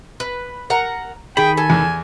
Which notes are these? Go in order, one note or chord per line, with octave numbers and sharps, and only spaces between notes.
B4
A#4 F#5 A#5
D#3 G#4 G5 B5
A4 G#5
E2